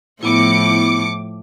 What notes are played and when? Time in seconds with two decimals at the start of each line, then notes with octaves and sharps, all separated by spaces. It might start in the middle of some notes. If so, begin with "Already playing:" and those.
0.23 A2 F3 B3 E4 D6 C#7